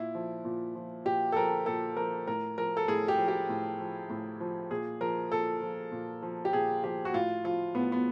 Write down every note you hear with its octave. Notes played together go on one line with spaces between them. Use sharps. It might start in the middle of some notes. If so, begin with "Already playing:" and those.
Already playing: A#2 E4
F3
A#2
F3
A#2 G4
A4
F3 A#4
A#2 A4
F3 A#4
A2 A#4
F3 A#4
A4
A2 G#4
G4
F3
G4
A2
F3
A2
F3
A#2 G#4
F3 A#4
A#2 A4
F3
A#2
F3
G4
A#2 G#4
F3 G4
F#4
A2 F4
F3 F4
A2 B3
B3